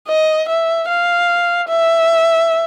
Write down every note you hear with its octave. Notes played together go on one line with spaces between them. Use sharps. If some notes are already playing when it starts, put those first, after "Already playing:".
D#5
E5
F5
E5